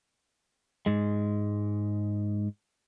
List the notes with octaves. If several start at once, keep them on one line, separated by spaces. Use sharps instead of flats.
G#2 G#3